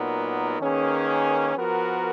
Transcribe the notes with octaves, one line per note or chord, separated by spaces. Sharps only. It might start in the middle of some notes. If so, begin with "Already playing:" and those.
Already playing: A#2 F#3 B3 D#4 A#4
D#3 A#3 C#4 G#4 B4
F3 B3 F#4 A#4